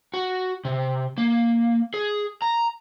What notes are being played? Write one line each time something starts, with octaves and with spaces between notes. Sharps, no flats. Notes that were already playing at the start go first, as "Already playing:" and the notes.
F#4
C3
A#3
G#4
A#5